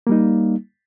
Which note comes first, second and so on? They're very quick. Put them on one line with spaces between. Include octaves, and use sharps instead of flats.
A#3 G3 D#4